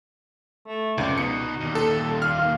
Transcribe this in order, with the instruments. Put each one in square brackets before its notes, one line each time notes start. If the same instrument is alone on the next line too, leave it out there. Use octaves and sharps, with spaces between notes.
[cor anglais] A3
[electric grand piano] C#2 [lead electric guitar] C3 F3 [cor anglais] D5
[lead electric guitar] B2 [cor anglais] D#4 [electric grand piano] C#7
[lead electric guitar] D#2 A#2
[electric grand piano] A4
[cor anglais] F5 [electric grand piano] F6